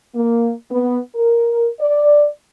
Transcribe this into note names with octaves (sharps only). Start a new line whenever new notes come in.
A#3
B3
A#4
D5